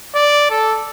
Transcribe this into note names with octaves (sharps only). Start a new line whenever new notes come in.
D5
A4